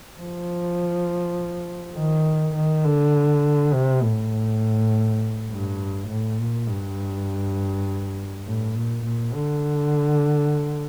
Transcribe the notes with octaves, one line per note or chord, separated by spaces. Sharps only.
F3
D#3
D#3
D3
C3
A2
G2
A2
A#2
G2
A2
A#2
A#2
D3